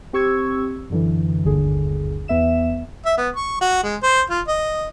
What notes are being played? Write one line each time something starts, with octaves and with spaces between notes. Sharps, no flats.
C4 G4 C#6 E6 G#6
F#2 D3 E3
G1 D#2 D3 G#4
E2 B3 E5 E7
E5
B3
C#6
F#4
G#3
C5
F4
D#5